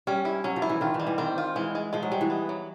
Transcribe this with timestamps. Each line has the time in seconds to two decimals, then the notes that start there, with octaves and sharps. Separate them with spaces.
0.07 G3 C#4
0.25 E4
0.44 F#3 C#4
0.56 F3
0.62 E4
0.70 E3
0.81 D#3 F4
0.94 E3
1.00 G3
1.07 E3
1.18 D#3 C4
1.38 F4
1.56 E3 G#3
1.75 G#3
1.93 F3 G#3
2.03 F#3
2.12 G3 G#3
2.21 E3
2.30 B3
2.49 F#3